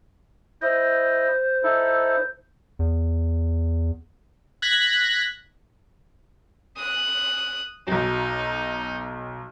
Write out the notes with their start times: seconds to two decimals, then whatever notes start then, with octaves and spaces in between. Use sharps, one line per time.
0.62 E4 C5 D#5
1.63 D#4 E4 A4
2.79 E2
4.62 F#6 G#6 A#6 B6
6.77 D#6 F#6
7.87 B1 F#3 D#4